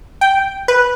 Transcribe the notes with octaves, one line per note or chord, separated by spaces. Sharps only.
G5
B4